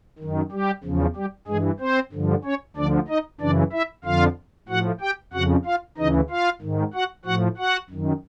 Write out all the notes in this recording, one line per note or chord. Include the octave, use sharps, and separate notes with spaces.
F#2 D#3
G3 G4
E2 C#3 F3
G3 G4
G2 E3 G#3 G#4
C4 C5
G2 D3 F3
C#4 C#5
D2 D3 F3 D4 D5
D#4 D#5
F#2 C#3 E3 D4 D5
E4 E5
F2 D3 F3 F4 F5
A2 F3 F#4 F#5
G4 G5
F2 C#3 F3 F#4 F#5
F4 F5
D2 C#3 E3 D#4 D#5
F4 F5
G#2 D#3
F#4 F#5
A2 F3 F#4 F#5
F#4 F#5
F#2 D#3